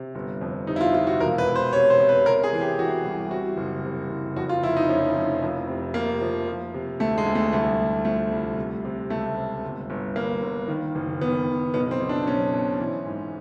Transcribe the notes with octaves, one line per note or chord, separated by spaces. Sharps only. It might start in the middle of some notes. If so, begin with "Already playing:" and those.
Already playing: C3
G1
F2
C3 D#4
E4
F4
C3 F4
F#4
E1 A#4
B4
E1
C5
C3 C#5
C5
C3
B4
C3 A#4
G#4
E3
G4
E3 F#4
C2
C3 F#4
F#1
C3
F#1
F2 F#4
F4
F1 E4
D#4
F3 C#4
F1
F2
C3
C3 A#3
F3
F3
C3
D2 A3
G#3
D2
A3
C2 A3
C2
F3 A3
C2
C3
C3
C#2 A3
C3
G1
G1
G2 A#3
G1
D#3
F#1
D#3 B3
F#1
B1 B3
C4
B1
D4
B1 C#4
B2
E3
G#2